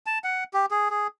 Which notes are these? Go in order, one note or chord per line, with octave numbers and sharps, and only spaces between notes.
A5
F#5
G4
G#4
G#4